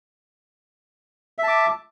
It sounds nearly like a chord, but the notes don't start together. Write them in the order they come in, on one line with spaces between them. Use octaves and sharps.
E5 A5 D6